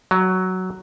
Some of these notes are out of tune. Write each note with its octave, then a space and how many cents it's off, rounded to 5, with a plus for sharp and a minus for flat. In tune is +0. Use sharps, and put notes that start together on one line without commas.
F#3 +5